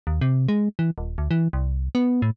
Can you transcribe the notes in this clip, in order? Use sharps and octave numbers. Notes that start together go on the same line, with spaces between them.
D#2
C3
G#3
E3
D#1
D2
E3
C2
B3
A2